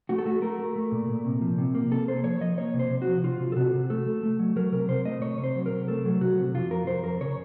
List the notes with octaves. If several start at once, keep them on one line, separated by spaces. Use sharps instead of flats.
A3 F#4
A4
A3 F#4
A3 A#4
A3
A3
A#2
A#2
C3
F3
C3
A#3
C3 A4
A#3 C5
F3 C#5
F3 D#5
A#3 C#5
C3
C5
C3
F#4
F3
C3 F4
C3
A4
C3 F#4
C3
A3 A4
A3
A3
F#3
F#3 A#4
C3 A#4
C3 C5
A3 D#5
C3 C#5
C3 C5
F#3
A#4
C3
A3 A4
F#3
C3 F#4
C3
F2 F4
F2 A#4
F2 C5
F2 A#4
C#3 C#5